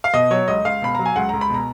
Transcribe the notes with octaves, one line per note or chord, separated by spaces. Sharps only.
F5
B2 D#5
F#3 C#5
C#2 D#5
C#2 F5
B2 B5
F#3 A#5
G#5
C#2 F#5
C#2 A#5
B5
B2 A#5